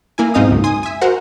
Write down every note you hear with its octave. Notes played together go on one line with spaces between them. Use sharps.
A#3 E4 G#5
B1 G#2 C4 D#4 F5 D#6
C#2 F#2
G#5 C6 D#6
E5 G#5
F#4 A#4 C5 F#5